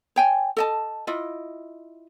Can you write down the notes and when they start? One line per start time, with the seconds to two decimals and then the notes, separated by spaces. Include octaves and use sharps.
0.16 C#5 G5 G#5
0.57 A4 D#5 A5
1.07 E4 F4 D#5